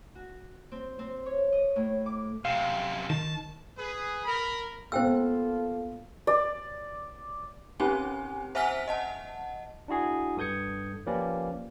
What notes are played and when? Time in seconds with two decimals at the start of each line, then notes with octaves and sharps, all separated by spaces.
0.15 F#4
0.72 C4
0.99 C4
1.26 C#5
1.52 D#5
1.76 A2
2.06 D6
2.45 F#2 C3 F5
3.10 D#3 A5
3.78 G#4 B4
4.25 A#4 B5
4.92 A#3 B3 F4 A4 C5 F5 G5 E6
6.27 D5
7.80 C4 C#4 D#4 G4 G#5
8.55 C5 E5 F#5 G#5 F6 B6
8.88 D#5 F#5 A5
9.88 D4 E4 F#4 G#4
10.37 G2 A4 D#6 G6 G#6 C#7
11.06 F3 A#3 C#4 G4 B4 D5